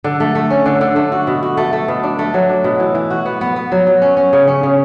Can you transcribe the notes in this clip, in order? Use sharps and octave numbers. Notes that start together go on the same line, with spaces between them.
D3
A3
A3
C#4
D3
D3
A3
F#4
B2
F#4
A3
A3
B2
D4
A3
F#3
D4
B2
E3
E3
F#4
B3
B3
B3
F#3
F#3
C#4
C#4
C#3
C#4
C#3